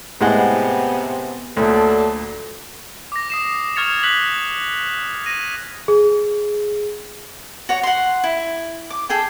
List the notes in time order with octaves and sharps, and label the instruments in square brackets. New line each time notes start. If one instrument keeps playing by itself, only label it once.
[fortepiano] A2 G#3 F#5 [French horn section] C3 B3
[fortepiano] D2 A#2 [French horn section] F#3 D4 A4
[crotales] D6 A#6
D#6 C7 E7
C#6 F6 G#6 A6 C#7 F7
F#6 B6 F#7
A#6 D#7
[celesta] G#4
[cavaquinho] F#4 C#5
F#5 C6
E4
D6
G#4 A4 G5